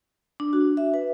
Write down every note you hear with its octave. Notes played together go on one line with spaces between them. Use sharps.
D4
F#4
E5
B4